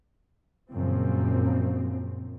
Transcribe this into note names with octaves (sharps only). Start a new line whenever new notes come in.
A#1 F#2 A#2 C#3 F3 C4